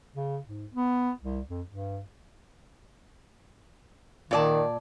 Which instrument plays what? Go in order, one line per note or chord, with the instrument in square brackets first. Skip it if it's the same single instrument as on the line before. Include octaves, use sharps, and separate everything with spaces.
[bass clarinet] C#3
G#2
B3
C2
F2
G2
[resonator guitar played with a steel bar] A#2 D5 A5 [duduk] D#3